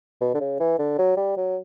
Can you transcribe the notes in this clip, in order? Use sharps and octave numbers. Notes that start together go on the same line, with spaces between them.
B2
D3
C#3
E3
D3
F#3
G3
F#3